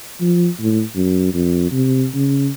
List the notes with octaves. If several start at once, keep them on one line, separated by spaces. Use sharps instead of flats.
F3
A2
F#2
F2
C3
C#3